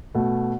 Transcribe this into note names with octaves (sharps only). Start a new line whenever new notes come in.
B2 A3